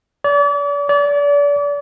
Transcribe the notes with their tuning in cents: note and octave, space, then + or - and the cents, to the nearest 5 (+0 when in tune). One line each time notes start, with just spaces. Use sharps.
D5 -40
D5 -35